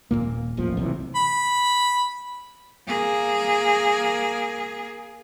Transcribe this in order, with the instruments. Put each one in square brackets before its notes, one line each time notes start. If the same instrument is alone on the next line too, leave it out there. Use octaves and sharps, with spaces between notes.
[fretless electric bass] D#1 G#1 A#2 A#3
D#1 A1 F3
B1 C3 E3
[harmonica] B5
[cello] A#3 G#4